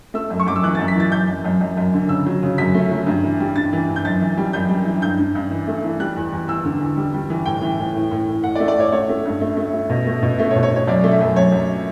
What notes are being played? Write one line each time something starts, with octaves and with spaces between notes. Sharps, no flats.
A3 E6
F#2
C#6
F#2 D6
E6
E3 F#6
F#2 A6
B6
E3 A6
F#2 G6
F#2
F#2
F#2
F#2
D3
C#3 E6
F#3
C#3
F#2 B6
A3
F#3
G2
E3
G3
G2 A6
E3
G2
G6
F#2 A6
E3
G3
F#2 G6
G3
E3
G2 G6
G2
G2
E3
A3
E3
G3 F#6
E2
E2
E2 E6
D3
E2
G3
G3
E3
A2 G5
E3
A2
A2
A2
A2
A2 F#5
D5
A3
D5
A2 C#5
A3 C#5
A3
G2
A3
A3
A3
B2
A3
B2
A3 E5
C#5
B2
C#5
B2
C#5
F#2 D5
A3
E5
F#2
F#2 C#5
F#2